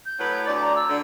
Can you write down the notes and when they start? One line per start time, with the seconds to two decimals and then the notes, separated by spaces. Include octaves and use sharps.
0.06 G6
0.19 A2 F#3 B4
0.46 D2 D5 A6
0.61 A#5
0.76 E6
0.89 D3